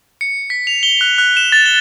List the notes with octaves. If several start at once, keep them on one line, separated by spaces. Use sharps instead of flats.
C#7
B6
F7
G7
F#6
F#6
E7
A6
G7